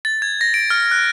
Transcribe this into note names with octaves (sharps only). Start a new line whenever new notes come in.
A6
G#6
A#6
D7
F6
F#6